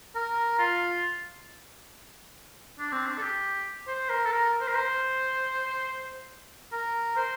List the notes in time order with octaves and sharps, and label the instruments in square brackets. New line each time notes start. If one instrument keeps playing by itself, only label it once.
[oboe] A#4
F4
D4
C4
D4
A4
G4
C5
A#4
A4
A#4
C5
A#4
C5
A#4
C5